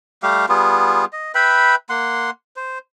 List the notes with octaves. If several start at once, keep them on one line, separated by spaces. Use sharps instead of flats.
G3 A3 G4 F5
G3 B3 F4 G#4
D#5
B4 E5 G5 B5
A#3 F#5 C6
C5